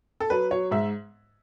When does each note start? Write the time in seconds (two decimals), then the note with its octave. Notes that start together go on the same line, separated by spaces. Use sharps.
0.20 A4
0.30 F#3 B4
0.51 F#3 C#5
0.71 G#2 E5